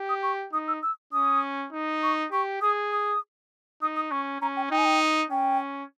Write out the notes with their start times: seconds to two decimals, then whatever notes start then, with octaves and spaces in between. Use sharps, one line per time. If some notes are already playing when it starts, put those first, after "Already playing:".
Already playing: G4
0.09 D#6
0.23 C#6
0.53 D#4 D#6
0.68 E6
0.83 E6
1.13 C#4 D#6
1.72 D#4
2.03 C#6
2.32 G4 C#6
2.62 G#4 D#6
2.92 D#6
3.82 D#4 D#6
3.96 D#6
4.11 C#4 C#6
4.41 C#4 A#5
4.57 G5
4.71 D#4 G5
4.78 G#5
4.85 G5
5.30 C#4 G5